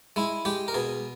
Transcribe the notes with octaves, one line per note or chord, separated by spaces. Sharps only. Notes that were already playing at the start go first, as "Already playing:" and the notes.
G#3 E4
G#3 G4
A#4
B2 G#4